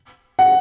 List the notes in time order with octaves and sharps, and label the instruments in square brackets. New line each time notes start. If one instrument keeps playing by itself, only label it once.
[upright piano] F#5